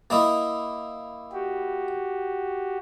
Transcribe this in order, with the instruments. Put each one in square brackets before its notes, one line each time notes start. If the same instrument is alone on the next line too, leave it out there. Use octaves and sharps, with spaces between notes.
[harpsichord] A#3 E4 D#5
[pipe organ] F#4 G4